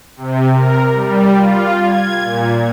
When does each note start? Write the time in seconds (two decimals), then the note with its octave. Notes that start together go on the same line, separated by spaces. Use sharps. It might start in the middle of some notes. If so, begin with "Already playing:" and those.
0.17 C3
0.52 A#4
0.92 G3
1.36 F4
1.81 G#6
2.20 A#2